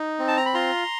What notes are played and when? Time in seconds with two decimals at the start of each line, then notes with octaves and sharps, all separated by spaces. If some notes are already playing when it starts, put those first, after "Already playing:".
Already playing: D#4
0.19 C4
0.28 A5
0.37 A#5
0.46 B5
0.54 F4 A#5 C6